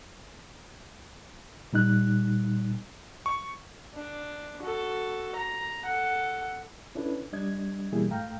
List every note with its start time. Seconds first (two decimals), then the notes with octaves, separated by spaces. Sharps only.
1.73 A#2 G3 D#4 F#6
3.26 C#6
3.95 D4
4.63 F#4 A4
5.35 A#5
5.85 A4 F#5
6.95 C#4 D4 E4 A4 B4
7.33 G3 D4 D#5 G#6
7.92 B2 E3 G3 A#3 E4 G#4
8.11 G#2 A3 F5 G5 A#5